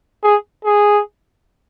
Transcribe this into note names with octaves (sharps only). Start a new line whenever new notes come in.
G#4
G#4